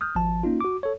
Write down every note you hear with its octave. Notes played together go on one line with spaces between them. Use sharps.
D#6 F6 G6
G#1 F3 A5
A#3 C#4 D#4 F4
F#4 D6
A4 C#5